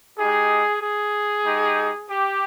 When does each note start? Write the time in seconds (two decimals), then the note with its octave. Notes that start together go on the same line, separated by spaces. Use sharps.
0.18 G#3 D#4 G4 G#4
0.82 G#4
1.46 G#3 D#4 G4
2.10 G4